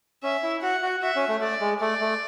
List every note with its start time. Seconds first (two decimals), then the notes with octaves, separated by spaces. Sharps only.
0.23 C#4 E5
0.43 E4
0.62 F#4 F#5
0.82 F#4
1.02 F#4 E5
1.16 C#4
1.28 A3
1.41 A3 D5
1.60 G#3
1.80 A3 D5
2.01 A3